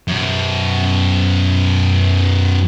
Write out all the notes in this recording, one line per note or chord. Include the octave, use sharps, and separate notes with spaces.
F#2 B2